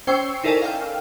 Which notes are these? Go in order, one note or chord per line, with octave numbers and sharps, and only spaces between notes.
C#4 C5 G5 C#6 E6 C7
D#4 E4 A4 A#4 D5 G#5
F5 G5 F6